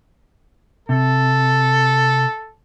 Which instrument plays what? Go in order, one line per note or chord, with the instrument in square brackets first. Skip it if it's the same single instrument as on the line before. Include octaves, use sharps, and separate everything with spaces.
[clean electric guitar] C3 [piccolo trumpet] A4